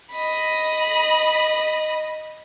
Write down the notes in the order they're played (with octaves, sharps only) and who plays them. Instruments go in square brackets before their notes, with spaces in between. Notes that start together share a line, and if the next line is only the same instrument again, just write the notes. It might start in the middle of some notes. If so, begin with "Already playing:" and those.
[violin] D#5 B5